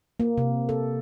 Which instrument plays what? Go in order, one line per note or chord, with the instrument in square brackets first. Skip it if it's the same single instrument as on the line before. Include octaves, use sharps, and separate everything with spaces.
[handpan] A#3
C3
A4